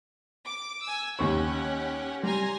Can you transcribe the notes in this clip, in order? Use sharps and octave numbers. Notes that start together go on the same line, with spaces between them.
D6
G#5 E6
D#2 C#4 G4 F#5 C#6
G3 G#5 A#5 C6